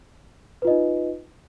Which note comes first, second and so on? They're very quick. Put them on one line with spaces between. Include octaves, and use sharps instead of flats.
B4 F4 D#5 D#4